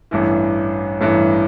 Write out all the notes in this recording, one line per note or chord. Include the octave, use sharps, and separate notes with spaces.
A1 G2 E3
A1 G2 E3